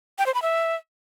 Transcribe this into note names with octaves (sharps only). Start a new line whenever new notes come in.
G5
C5
B5
E5